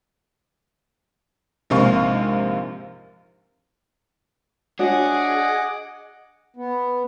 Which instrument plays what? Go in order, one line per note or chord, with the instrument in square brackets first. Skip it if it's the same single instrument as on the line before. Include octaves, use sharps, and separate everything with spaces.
[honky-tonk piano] A#1 G#2 C3 A#3 F5 C#6
[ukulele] D4 F#4 C#5 [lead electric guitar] G#4 [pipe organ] D#5 [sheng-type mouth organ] F#5 D6
[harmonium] B3